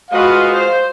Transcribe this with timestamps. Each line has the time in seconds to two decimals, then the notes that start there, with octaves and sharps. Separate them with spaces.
0.11 G#3 F4 F#4 B4 D#5 F5
0.53 C5